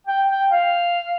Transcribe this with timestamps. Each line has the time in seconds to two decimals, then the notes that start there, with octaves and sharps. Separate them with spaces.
0.07 G5
0.29 G5
0.51 F5